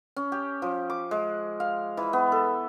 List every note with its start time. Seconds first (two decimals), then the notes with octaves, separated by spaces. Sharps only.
0.17 C#4
0.32 G4
0.62 F3
0.90 D6
1.11 G#3
1.60 F5
1.97 E3
2.13 B3
2.32 A4